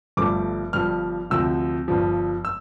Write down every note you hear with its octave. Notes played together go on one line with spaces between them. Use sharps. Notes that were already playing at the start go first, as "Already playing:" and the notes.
G1 G2 F3 A3 D6
G1 G2 F3 F6
D2 C3 F3 E6
G1 G2 F3
E6